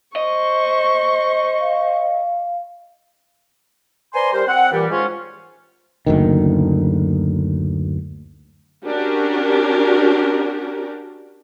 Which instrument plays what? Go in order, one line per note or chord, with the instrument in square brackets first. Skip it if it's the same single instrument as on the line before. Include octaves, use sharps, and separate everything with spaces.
[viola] C5 C#6 [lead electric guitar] D#5
[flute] F5
[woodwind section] B4 C5 D5 G#5 A#5 C6
G3 A#4 C5
C4 F#5
A#2 E3 G3 G4
G#2 G#3 C#4 F4
[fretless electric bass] F#1 D2 D#3
[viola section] C#4 D4 F#4 G4 A#4